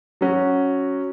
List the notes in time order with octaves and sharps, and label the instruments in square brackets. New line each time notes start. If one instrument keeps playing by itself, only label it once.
[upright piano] F#3 C#4 F#4